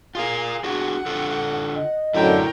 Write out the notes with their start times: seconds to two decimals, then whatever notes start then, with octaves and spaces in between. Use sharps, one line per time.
0.15 F4 G#4 A#4 F5
0.64 D4 F#4 G#4 F#5
1.06 D3 F4 A4
1.75 D#5
2.14 F#2 D3 A3 E4 A#4 G5